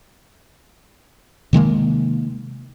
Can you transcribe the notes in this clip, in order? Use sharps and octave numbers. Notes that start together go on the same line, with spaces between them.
C3 D#3 G#3 A#3